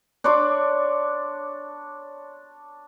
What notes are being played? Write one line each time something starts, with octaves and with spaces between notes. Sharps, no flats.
D4 C#5 C6 D6